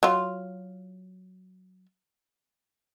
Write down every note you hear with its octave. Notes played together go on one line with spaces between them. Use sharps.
F#3 F4